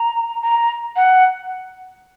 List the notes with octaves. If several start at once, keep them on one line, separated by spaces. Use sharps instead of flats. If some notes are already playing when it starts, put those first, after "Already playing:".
Already playing: A#5
A#5
F#5